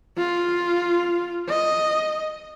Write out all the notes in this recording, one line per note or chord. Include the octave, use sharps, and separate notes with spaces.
F4
D#5